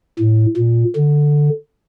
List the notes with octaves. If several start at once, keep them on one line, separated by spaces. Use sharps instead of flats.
A2
A#2
D3